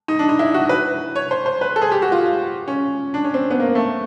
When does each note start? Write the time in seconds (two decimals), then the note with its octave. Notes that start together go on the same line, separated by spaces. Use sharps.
0.08 D#4
0.19 D4
0.29 D#4
0.39 E4
0.54 F#4
0.69 B4
1.15 C#5
1.31 C5
1.46 C5
1.61 B4
1.76 A4
1.81 G#4
1.92 G4
2.02 F#4
2.12 F4
2.68 C#4
3.14 D4
3.24 C#4
3.34 C4
3.51 B3
3.60 A#3
3.75 A3